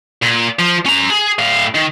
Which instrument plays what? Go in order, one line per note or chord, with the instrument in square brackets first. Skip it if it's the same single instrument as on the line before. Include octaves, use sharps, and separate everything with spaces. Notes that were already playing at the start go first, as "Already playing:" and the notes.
[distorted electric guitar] A#2
F3
C#4 A#5
G#4
A2 F5
D#3